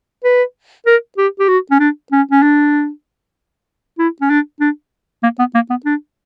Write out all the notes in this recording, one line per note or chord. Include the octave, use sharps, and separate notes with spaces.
B4
A#4
G4
G4
F#4
C#4
D4
C#4
C#4
D4
E4
C#4
D4
D4
A#3
B3
A#3
B3
D4